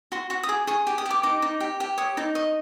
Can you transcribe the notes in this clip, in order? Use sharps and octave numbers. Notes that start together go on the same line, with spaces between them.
F#4 C6
F#4 C#6
D#6
G#4 D6
G#4 C#6
G4 D6
D#6
G4 D6
D#4 D6
D#4
G4
G4
C#5 D#6
D#4 D6
D#5 C#6